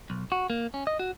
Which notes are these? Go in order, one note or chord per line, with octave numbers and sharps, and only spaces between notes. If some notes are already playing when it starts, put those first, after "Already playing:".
B1
F#4
A#3
C#4
D#5
F#4